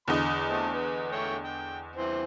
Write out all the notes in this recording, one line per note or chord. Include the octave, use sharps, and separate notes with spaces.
E2 D3 D#5 B5
A3 C4
B4
A3 C#5 G5
G5
E3 C4 C5